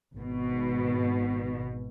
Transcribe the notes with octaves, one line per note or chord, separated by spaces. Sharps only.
G#1 B2